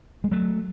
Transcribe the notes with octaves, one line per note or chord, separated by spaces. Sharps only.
G#3
F#3 A3